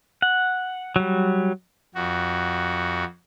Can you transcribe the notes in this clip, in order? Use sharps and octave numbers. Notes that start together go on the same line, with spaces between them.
F#5
F#3 G3
F2 F#4